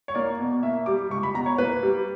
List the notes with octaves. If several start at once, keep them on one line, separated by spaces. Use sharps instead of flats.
C#5
A#3 D5
B2
A#3 E5
G3 D6
C#2 C#6
B5
B2 A#5
C#5
A#3 B4
G3